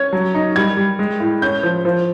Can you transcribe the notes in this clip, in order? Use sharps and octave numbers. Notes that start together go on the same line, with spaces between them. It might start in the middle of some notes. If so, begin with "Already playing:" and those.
Already playing: C#4 G#6
F#3
D#4
G3 G#6
G3
G#3
A2
C#4 G6
F3
F3